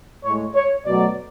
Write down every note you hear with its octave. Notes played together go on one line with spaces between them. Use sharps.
A2 G#3 C#5
C#5
B2 F#3 A3 D5